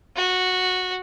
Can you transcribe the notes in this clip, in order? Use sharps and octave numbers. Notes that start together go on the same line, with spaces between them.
F#4